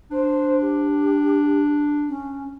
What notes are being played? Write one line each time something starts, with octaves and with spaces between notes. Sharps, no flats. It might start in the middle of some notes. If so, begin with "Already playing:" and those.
D4 C5
G4
C#4